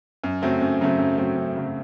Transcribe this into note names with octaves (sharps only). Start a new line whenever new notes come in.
F#2
C#3 F#3 A3 C4
F#2
C#3 F#3 A3 C4
F#2
C#3 F#3 A3 C4
F#2
C#3 F#3 A3 C4